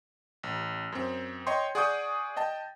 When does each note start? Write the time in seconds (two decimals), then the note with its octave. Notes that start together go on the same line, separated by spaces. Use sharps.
0.43 A1
0.92 F#2 C4
1.47 C#5 D#5 G5 C6 C#6
1.75 G#4 D5 F#5 C#6 D#6 G6
2.37 D#5 G5 A5